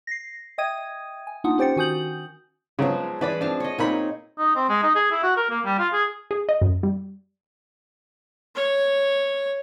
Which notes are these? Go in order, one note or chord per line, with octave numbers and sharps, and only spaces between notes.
A#6 C7
D#5 E5 G5 D#6 G#6 D#7
G#5
A#3 D4 D#4 F4 F#5 D#6
C#4 G4 C5 G5 A6 C#7
D#3 F#4 G#5 D#6 G6 F#7
C#3 F3 F#3 G#3 B3
E3 G#4 B4 D5 B5
F3 C4 D4 F5
C#5 D#5
A#2 C4 D#4 A#4 C#5 B5
D#4
C4
G#3
D#4
G#4
E4
F#4
A#4
A#3
G3
F4
G#4
G#4
D#5
F#2
G3
C#5